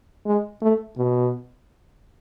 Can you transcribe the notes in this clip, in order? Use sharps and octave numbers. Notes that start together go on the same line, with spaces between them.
G#3
A3
B2